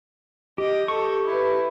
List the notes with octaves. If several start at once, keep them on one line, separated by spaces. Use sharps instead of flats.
G4 D#5
G4 A4 C#6
E4 B4